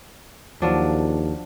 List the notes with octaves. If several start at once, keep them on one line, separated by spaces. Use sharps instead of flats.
D#2 F3 F#3 D4